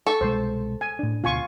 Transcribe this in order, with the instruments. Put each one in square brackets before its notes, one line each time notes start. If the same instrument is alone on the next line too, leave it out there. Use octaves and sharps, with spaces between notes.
[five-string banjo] A4 [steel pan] C#6
[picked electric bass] C2 B2 G#3 [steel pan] C5
[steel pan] G#5
[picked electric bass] A2 D4
[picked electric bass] D2 B2 [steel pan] F4 G#5 C#6